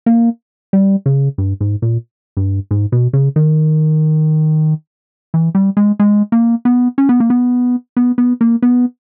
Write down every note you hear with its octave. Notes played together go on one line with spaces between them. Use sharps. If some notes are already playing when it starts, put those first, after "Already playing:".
A#3
G3
C#3
G2
G#2
A#2
G2
G#2
B2
C#3
D#3
E3
G3
G#3
G#3
A#3
B3
C#4
B3
A#3
B3
B3
B3
A#3
B3